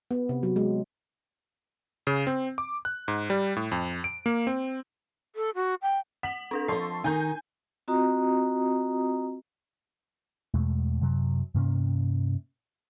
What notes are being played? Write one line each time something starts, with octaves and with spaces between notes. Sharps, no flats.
B3
C3
F#3
G#3
C#3
C4
D6
F#6
G#2
G3
A2
F2
D7
A#3
C4
A4
F#4
G5
F#5 B6 F#7
C4 D4 A4
F3 A4 D#5 C6 C#6 C7
D#3 D#4 G#5 G6
C4 F4 F#4 D#5 A#5 D#6
E2 B2 G#3 A3
F#2 C3 F#3
G2 C3 A#3 C#4